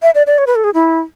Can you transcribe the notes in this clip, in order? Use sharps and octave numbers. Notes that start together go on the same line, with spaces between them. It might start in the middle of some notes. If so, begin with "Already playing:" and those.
E5
D5
D5
C#5
B4
A4
G#4
E4